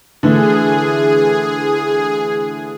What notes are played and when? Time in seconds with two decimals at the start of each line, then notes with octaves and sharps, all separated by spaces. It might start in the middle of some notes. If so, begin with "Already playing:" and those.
0.23 D3 E3 A3 G#4